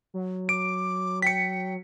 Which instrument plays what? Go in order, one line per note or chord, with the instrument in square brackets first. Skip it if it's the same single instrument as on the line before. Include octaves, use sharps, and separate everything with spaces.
[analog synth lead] F#3
[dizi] D6 [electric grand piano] D7
[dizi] G5 [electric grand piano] B6 C#7